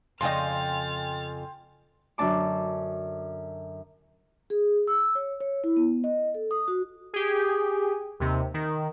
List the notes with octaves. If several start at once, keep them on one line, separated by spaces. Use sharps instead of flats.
F2 C#3 D#5 G5 G#5 C6 F6 A6
F#2 D3 D4 A5 D6
G#4
E6
C#5
C#5
E4
B3
D#5
A4
D#6
F#4
G4 G#4
D#2 C3
D#3